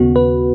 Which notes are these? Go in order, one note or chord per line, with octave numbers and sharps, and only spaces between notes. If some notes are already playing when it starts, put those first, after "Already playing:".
Already playing: D#2 C#3 B3 F#4
B4